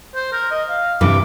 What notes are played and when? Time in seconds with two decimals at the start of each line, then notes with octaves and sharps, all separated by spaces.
0.15 C5
0.32 A#4
0.51 D#5
0.70 F5
1.01 G2 C3 E3 D6